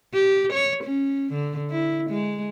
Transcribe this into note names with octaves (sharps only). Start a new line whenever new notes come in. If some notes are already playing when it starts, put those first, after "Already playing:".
G4
C#5
C#4
D3
E4
G#3